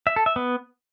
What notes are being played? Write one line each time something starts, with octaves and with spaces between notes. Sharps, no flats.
E5
A4
E5
B3